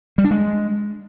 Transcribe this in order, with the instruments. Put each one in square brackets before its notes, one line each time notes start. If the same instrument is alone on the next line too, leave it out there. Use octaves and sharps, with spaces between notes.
[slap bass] G3
D4
G#3